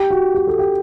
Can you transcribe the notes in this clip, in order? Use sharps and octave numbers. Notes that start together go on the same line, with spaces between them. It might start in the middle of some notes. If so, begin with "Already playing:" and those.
Already playing: G4
F#4
G4
A4
G4